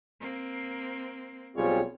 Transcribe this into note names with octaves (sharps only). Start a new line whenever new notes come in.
A#3 C4
B1 G3 C4 F4 G#4 C#5